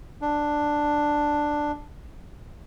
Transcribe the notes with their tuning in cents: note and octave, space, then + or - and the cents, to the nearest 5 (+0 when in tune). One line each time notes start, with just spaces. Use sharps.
D4 +5